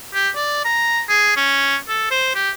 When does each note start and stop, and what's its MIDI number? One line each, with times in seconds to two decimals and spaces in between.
0.14 0.29 67
0.35 0.61 74
0.65 1.02 82
1.09 1.34 68
1.36 1.76 61
1.88 2.08 69
2.11 2.34 72
2.35 2.51 67